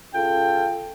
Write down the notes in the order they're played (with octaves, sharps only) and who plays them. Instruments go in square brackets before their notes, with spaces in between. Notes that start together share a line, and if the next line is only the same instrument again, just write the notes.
[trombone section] C#3 F4 A4 [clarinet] G5